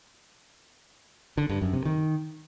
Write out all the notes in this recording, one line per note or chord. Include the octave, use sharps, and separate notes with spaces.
D3
G2
F#2
C3
D#3